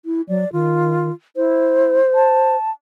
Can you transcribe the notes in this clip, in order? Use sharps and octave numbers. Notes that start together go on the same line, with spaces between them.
E4
F#3 D5
D#3 F4
E4 C5
A5